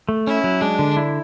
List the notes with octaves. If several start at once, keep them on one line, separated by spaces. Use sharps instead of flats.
A3
C#4 E4
F#3
G#3 D4
D3
E4